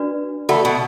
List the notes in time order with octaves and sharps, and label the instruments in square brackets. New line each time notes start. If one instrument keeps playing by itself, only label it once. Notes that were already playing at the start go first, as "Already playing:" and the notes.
Already playing: [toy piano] D4 F#4 B4 D5
[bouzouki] A3 [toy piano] F#4 A4 D5 F#5 B5
[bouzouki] B2